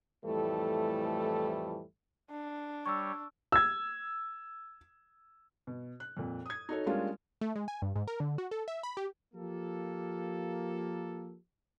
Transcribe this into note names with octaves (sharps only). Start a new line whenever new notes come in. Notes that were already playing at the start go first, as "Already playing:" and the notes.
F2 A2 E3 G3 A3 A4
D4
G3 C#5 C#6 E6
E6 G#6
B2
F#6
F2 A#2
D#6 G#6
D#4 F#4 A4 C#5
G3 G#3 A#3 C#4 D4 F4
A3
G#3
G#5
G2
G#2
A#4
D3
F#4
A4
E5
B5
G4
F3 A#3 G4 A4